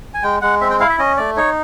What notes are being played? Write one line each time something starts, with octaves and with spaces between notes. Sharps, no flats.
G#5
G#3 G5
G#3 F#5
C4 E5
G5
E4 F5
E5
C#4 D#5
A3 D5
D#4 C#5